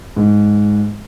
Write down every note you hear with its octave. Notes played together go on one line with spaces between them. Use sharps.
G#2